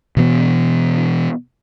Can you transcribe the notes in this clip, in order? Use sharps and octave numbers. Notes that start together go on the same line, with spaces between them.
B2 E3 B3